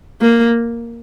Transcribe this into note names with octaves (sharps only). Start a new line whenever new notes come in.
A#3